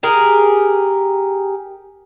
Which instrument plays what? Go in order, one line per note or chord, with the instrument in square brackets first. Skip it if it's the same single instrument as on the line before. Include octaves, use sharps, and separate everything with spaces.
[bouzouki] G4 G#4 A#4